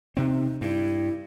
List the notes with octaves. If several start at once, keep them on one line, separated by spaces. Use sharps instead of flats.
C3 C4 D#4
G2 E4